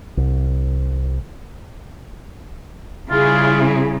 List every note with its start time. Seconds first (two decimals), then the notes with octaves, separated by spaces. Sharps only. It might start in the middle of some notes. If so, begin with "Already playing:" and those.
0.17 C2
3.11 C#3 G3 E4 F4 G#4